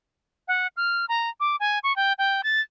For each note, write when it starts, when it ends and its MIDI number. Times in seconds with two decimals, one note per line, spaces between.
0.48 0.67 78
0.77 1.05 89
1.09 1.30 82
1.40 1.56 86
1.60 1.79 80
1.83 1.95 85
1.96 2.13 79
2.18 2.42 79
2.43 2.60 93